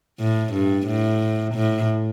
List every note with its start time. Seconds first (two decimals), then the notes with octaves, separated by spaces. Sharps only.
0.20 A2
0.53 G2
0.87 A2
1.55 A2